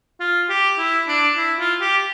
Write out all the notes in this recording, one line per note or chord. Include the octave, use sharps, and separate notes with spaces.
F4
G4
E4
D4
E4
F4
G4